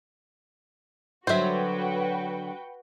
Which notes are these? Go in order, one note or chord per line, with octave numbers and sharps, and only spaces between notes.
D3 F#3 F#4 B4 C5 E5 G5